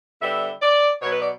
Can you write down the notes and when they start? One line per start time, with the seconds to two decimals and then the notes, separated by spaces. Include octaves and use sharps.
0.21 D3 G3 B3 E5
0.61 D5
1.01 B2 F#3 B3 C#5
1.11 B4
1.21 D5